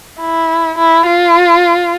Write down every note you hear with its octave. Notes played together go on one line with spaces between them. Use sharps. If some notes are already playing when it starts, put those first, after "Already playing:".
E4
E4
F4